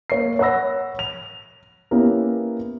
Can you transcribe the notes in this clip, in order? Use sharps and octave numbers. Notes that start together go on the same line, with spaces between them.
A#3 C#5 C7
C#5 F#5 B5 E6 A#6
F7
A#3 B3 C#4 E4 G4 A#4